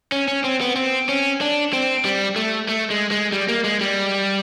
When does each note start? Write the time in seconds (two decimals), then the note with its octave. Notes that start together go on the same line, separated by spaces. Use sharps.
0.12 C#4
0.28 C#4
0.44 C4
0.61 B3
0.76 C4
1.09 C#4
1.41 D4
1.73 C4
2.05 G3
2.36 A3
2.68 A3
2.90 G#3
3.11 G#3
3.32 G3
3.49 A#3
3.64 G#3
3.81 G3